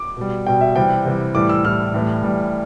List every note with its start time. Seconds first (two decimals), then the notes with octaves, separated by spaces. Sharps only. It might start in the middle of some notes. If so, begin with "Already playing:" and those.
Already playing: D6
0.17 B2 G3
0.46 B2 G3 G5
0.61 E5
0.76 C3 E3 G3 G5
1.05 C3 E3 G3
1.35 A2 E3 G3 D6
1.49 E6
1.64 A2 E3 G3 F6
1.94 A2 E3 G3
2.23 A2 E3 G3